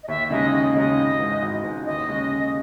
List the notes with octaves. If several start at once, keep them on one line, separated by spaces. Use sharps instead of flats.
D#5
D#2 E5
C#3 G#3 D#4 D#5
D#2 D#5
C#3 G#3 D#4 D#5
G#1
G#2 E3 G#3
G#1
G#2 E3 G#3
D#2 D#5
C#3 G#3 C#4 G#4
D#2